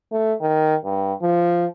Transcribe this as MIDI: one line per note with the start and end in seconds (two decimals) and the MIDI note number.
0.11 0.34 57
0.41 0.75 51
0.84 1.13 43
1.22 1.66 53